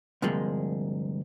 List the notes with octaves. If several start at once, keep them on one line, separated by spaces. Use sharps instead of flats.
D2 G2 C3 F3 G#3 A#3